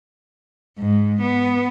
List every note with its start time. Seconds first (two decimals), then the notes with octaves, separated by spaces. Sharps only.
0.79 G#2
1.22 B3